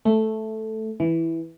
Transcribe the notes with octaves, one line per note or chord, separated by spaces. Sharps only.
A3
E3